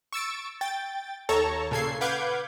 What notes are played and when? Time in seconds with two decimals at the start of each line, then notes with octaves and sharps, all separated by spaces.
0.13 C#6 E6 A6 D7
0.61 G5 A6
1.29 D#2 A4 C#5 A5 A#5 C#6
1.71 A#2 C#3 A4 G#6 C7
2.01 B4 F5 F#5 D6 G6 G#6